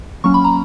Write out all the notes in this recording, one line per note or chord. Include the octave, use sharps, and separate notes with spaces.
F#3 A#3 C#4 C#6
B5
A#5